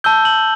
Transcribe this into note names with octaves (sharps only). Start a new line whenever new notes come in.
A5 E6 G6 G7
F#7